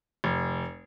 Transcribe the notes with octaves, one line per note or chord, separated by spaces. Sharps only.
F1